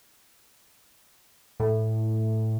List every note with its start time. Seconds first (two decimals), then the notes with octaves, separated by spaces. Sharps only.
1.60 A2